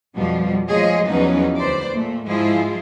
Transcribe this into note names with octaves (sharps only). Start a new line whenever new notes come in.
F2 B2 F3 G3
F3 G#3 A3 G#4 C#5 D#5
E2 F3 F#3 C#4 D#4 B4
D2 B4 C5 D5
A#2 A3
G#2 F3 G#3 E4 F4 G#4